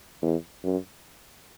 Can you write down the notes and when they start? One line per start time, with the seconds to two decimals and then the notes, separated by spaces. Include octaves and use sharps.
0.22 E2
0.64 F#2